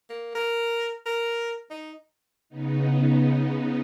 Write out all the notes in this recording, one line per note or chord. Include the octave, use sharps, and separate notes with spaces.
A#3
A#4
A#4
D#4
C#3 B3 D#4